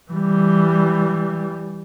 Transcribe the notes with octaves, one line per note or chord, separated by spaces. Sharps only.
E3 G3